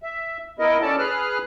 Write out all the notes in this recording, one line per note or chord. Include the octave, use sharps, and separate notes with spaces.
E5
B3 E4 A#4 D#5
C#4 A4 D5 A5
G#4 B4 F6 F#6